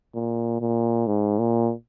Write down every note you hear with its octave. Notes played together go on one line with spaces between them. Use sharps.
A#2
A#2
G#2
A#2